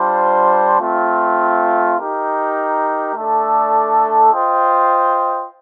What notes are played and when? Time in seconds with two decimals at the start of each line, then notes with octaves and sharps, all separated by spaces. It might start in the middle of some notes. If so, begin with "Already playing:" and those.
Already playing: G3 D4 F4 C5
0.80 A3 C4 F4
1.98 D#4 G4 A#4
3.15 A3 D4 A4 D5
4.33 F4 C5 D#5 G5